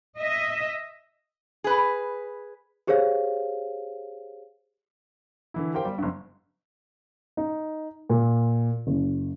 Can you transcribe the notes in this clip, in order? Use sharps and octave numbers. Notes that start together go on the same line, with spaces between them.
D#5 E5
G#4 B4
G4 G#4 C5 C#5 F5
D3 E3 E4
G4 A#4 C5 F5 G5
G3
F#1 G2
D#4
A#2
F#1